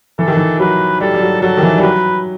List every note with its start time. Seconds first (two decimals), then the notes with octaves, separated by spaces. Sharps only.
0.19 E3 A4
0.28 D#3
0.37 E3
0.60 F#3 B4
1.01 G3 A4
1.14 G3
1.22 F#3
1.41 F#3 A4
1.58 D#3
1.63 E3
1.78 G3
1.83 F#3 B4